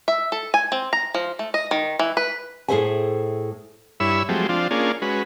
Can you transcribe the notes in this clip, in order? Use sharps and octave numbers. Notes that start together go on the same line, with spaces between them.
E5
A4
G#5
C4
A#5
F3
A3
D#5
D#3
E3
B4
A2 G#4 A4 C5 E5 G#5
G2 E4 C#5 B5 E6
F3 F#3 G#3 A3 C4 G4
F3 C4 D4 F4
A#3 C#4 D4 F4 G#4
G#3 C#4 F#4 B4